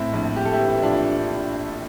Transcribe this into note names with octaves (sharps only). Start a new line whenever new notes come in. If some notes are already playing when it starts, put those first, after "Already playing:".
Already playing: A2 C4 E4
A#1
A#1 G4
A4
E4 G4
E3
E4
A#1 D4 F4